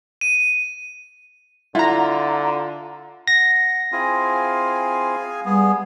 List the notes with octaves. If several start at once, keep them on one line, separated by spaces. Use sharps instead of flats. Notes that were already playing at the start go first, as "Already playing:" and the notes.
D#7
D3 E4 F4 F#5 A#5
F#5 A#6
C4 E4 F4 G#4 F5 G#5
G3 B3 G#4